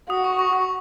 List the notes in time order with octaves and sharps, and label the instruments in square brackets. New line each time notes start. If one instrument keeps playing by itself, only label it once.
[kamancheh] F#4 [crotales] D#6
[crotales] C#6
C#6
D#6